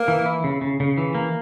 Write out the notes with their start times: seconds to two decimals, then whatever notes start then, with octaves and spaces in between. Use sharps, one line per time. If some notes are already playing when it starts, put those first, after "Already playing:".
Already playing: A#3
0.08 E3
0.26 E4
0.44 C#3
0.61 C#3
0.80 C#3
0.98 E3
1.15 A#3